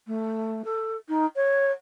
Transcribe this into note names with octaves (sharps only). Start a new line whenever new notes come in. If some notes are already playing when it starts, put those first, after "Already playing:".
A3
A4
D#4
C#5